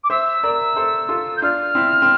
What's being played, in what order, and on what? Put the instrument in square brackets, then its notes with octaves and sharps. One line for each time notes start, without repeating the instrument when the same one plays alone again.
[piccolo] D6
[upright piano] C5 E5 [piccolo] E6
[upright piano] A#4 D5
A4 C5
F4 A4
[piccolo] G6
[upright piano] D4 F4 [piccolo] F6
[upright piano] C4 E4
C4